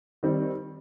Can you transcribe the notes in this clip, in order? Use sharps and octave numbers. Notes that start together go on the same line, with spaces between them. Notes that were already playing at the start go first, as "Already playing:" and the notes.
D#3 G3 C4